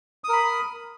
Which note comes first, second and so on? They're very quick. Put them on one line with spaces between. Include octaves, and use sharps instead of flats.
D#6 A#4 B5